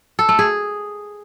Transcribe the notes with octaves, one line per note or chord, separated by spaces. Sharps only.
A4
A3
G#4